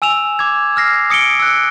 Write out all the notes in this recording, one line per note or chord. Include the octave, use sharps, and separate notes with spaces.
G#5 E6 E7 F7
D6 G#6
E6 F6 A#6 C7
D#6 C#7 D7 G7
E6 F#6